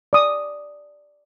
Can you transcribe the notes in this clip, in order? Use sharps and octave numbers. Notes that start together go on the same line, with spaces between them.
D5 D#6